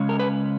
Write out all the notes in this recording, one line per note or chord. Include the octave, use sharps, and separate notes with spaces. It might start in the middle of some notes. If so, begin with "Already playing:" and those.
Already playing: C#3 G#3 C#4
A#4
B4